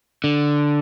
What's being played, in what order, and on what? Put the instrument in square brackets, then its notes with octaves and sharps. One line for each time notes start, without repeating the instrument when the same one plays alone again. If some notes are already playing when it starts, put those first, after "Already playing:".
[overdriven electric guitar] D3